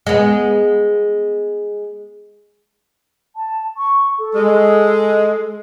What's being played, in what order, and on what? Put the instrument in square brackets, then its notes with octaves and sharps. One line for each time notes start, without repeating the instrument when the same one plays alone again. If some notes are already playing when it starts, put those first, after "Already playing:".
[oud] G#3 B3
[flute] A5
C#6
A4
[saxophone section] G#3